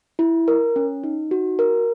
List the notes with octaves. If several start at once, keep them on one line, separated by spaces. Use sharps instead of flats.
E4
A#4
C#4
D#4
F#4
A#4